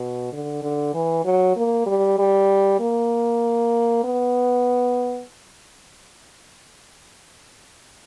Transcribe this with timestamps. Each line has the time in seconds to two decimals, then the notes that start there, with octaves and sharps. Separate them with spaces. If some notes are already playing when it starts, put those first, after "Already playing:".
Already playing: B2
0.32 D3
0.62 D3
0.94 E3
1.25 F#3
1.56 A#3
1.86 G3
2.18 G3
2.79 A#3
4.04 B3